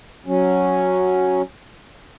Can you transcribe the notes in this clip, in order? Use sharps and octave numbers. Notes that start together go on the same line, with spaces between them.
F#3 C#4